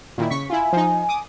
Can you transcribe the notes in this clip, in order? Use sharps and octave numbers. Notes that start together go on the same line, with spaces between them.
A#2 D#3 E4
C#3 C#6 B6
E4 F4 G#5
F3 D#4
D6 D#6